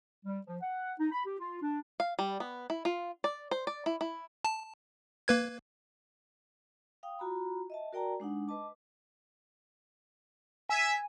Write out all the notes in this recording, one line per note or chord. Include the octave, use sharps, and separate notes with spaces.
G3
F3
F#5
D#4
B5
G4
F4
D4
F5
G3
B3
E4
F4
D5
C5
D5
E4
E4
A5
A#3 B4 G#6
F5 G5 D#6
F4 F#4 A#5 B5
D#5 E5 A5
F#4 A#4 D5 G5 A5 A#5
G#3 D4 D#4 F#5
B4 D#5 A5 D6
E5 G#5